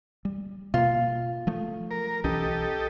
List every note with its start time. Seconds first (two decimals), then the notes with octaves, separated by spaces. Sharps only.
0.25 G3
0.74 B2 A#3 F4
1.47 F3 A3
1.91 A#4
2.24 B1 E3 C#4 G4 A4 D#5